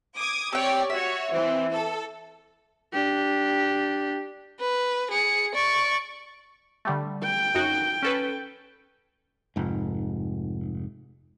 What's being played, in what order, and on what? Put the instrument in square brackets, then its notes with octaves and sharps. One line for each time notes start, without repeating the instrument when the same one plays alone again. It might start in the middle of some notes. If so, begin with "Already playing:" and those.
[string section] D6 D#6 G#6
[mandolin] C4 G5 [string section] G4 C#5 D5
[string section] F#4 C#5 [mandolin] E5
[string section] E3 C4
A4
[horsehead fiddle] D4 G4
[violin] B4
G#4 C#7
D5 C#6
[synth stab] D3 G3 A3
[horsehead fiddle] G5
[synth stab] F#2 D#4 F#4
C#4 A4 B4
[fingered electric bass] F1 G#2